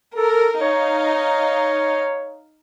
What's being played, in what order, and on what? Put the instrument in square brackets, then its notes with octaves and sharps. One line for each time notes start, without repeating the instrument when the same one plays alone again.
[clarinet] A4 [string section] A#4
[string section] D#4 F5 [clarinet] C#5